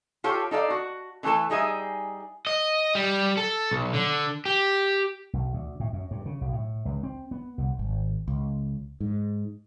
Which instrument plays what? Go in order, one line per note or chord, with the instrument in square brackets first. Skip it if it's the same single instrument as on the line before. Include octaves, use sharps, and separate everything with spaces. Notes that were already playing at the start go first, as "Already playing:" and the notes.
[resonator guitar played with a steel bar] F4 G4 A4 C#5
D#4 A4 D5 F5
F#4
D3 E3 A3 A4 A5
G3 D#4 G#4 E5 G#5
[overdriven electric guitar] D#5
G3
A4
B1
D3
G4
[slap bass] B1
D2
A2
F#2
G2
C#3
B1
A2
C#2
C4
B3
C2
[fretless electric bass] G#1
C#2
G#2